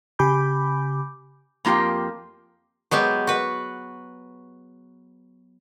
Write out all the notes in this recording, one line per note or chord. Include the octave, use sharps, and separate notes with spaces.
C#3 G4 G#5 B5 D6 G6
F2 A#3 F4 G4 G5
F#3 G#3 B3 G4
F#4 B4